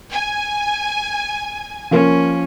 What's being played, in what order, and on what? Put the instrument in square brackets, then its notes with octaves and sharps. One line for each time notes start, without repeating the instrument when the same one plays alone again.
[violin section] G#5
[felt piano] F3 A#3 [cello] C#4